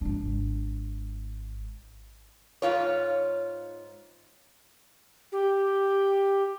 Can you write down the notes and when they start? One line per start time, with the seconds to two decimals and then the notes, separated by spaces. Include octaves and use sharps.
0.01 G#1 D4
2.62 G#2 C3 F4 C#5
5.32 G4